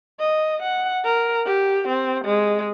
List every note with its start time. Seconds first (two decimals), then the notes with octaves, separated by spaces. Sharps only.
0.20 D#5
0.62 F#5
1.05 A#4
1.46 G4
1.88 C4
2.25 G#3